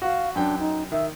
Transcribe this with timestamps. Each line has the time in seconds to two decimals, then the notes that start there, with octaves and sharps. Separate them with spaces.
0.02 F#4 F5
0.36 F#2 D4 G5
0.59 D#4
0.92 D#3 E5